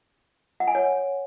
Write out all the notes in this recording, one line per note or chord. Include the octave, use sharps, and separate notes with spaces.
F#5
G#5
C#5